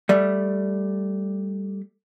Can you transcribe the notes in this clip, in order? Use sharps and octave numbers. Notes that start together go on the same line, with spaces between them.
G3 A3 D5